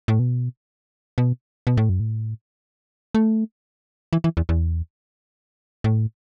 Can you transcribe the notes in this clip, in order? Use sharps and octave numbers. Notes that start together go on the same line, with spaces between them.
A2
B2
B2
B2
A2
F#2
A2
A3
E3
E3
E2
E2
A2